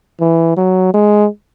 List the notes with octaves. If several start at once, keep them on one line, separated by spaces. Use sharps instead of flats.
E3
F#3
G#3